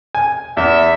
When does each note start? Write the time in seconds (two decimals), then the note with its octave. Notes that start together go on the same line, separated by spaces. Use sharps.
0.15 G#5
0.57 E2 E5